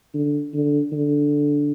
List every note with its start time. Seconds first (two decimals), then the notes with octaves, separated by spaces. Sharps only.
0.14 D3
0.54 D3
0.92 D3